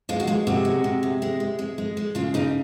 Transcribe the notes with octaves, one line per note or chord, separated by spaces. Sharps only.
G#3 F4
F#4
G#3 F4
C3 F#4
G#3
C3
C3
G#3
G#3
G#3
G#3
G#3
C#3 F4
C#3 D#4